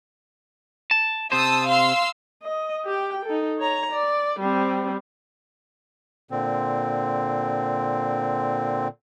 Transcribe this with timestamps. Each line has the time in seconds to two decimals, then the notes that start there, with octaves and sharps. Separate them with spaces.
0.91 A5
1.32 C3 C5 A5 D#6 E6
1.68 F5 C6 E6
2.43 D#5
2.86 G4 G5
3.25 D#4 A4
3.59 C#5 A#5
3.92 D5
4.40 G3 C4
6.31 A#2 D3 C4